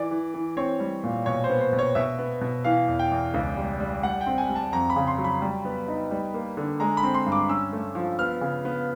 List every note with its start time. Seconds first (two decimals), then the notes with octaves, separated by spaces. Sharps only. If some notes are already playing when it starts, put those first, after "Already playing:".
Already playing: E3 D5
0.11 E3
0.34 E3
0.57 C4 C#5
0.80 G3
1.04 A#2
1.26 B2 C#5
1.44 C5
1.49 B3
1.60 C5
1.73 B2
1.79 C#5
1.95 B2 E5
2.19 B3
2.41 B2
2.64 E3 F5
2.88 E2
2.99 G5
3.11 E2
3.34 C#2
3.57 G3
3.80 G3
4.03 G3 F#5
4.21 G5
4.26 C4
4.38 G#5
4.49 G3
4.55 A5
4.72 F2 A#5
4.90 B5
4.96 C#3
5.07 C6
5.18 F#3
5.24 B5
5.42 G3
5.65 B3
5.88 D#4
6.11 G3
6.34 A#3
6.57 D3
6.80 G#3 A#5
6.97 B5
7.03 C4
7.14 C6
7.26 G2
7.32 D6
7.49 C#4 E6
7.73 A3
7.95 F3
8.19 B3 F6
8.41 C#3
8.65 B3